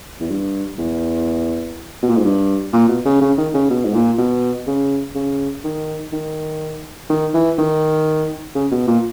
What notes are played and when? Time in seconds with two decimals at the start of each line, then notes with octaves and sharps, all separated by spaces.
0.20 E2
0.30 G2
0.78 E2
2.03 B2
2.09 A#2
2.17 G#2
2.25 G2
2.73 A#2
2.89 B2
3.05 C#3
3.21 C#3
3.38 D#3
3.54 C#3
3.70 B2
3.84 G#2
3.94 A#2
4.18 B2
4.67 C#3
5.15 C#3
5.64 D#3
6.12 D#3
7.10 D#3
7.34 E3
7.58 D#3
8.55 C#3
8.71 B2
8.88 A#2